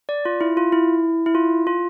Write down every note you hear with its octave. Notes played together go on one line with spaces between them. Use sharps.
D5
F4
E4
F4
E4
E4
F4
F4